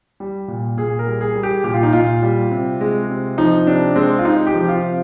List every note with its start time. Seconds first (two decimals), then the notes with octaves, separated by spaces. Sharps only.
0.20 G3
0.48 A#2
0.77 A#2 G#4
0.99 A#4
1.07 G3
1.21 G#4
1.35 G3
1.43 G4
1.64 A#2 G4
1.74 F4
1.83 D#4
1.93 A#2 F4
2.22 G3
2.51 C3
2.81 G#3
3.09 C3
3.38 F3 D#4
3.67 C3 D4
3.95 G#3 C4
4.19 F4
4.25 C3 D#4
4.47 G4
4.54 F3
4.68 F4
4.83 C3